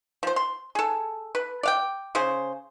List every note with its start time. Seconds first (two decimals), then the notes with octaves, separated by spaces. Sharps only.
0.23 F3 C5
0.36 C6
0.75 G#4 A4
1.35 B4
1.63 D5 F5 G5
2.15 C#3 G#4 C5